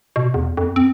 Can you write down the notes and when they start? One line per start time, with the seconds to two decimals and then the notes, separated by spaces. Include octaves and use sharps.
0.16 B2
0.34 E2
0.57 F2
0.76 C4